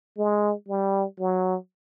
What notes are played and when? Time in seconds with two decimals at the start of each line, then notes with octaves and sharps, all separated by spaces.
0.17 G#3
0.68 G3
1.20 F#3